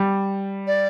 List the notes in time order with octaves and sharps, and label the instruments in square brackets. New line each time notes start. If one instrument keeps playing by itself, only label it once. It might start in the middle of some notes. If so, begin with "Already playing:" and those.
Already playing: [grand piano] G3
[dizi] D5